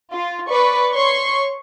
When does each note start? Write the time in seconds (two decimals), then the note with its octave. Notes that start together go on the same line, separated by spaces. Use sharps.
0.12 F4
0.49 B4 D5 C#6
0.93 C#5 C6 C#6 C7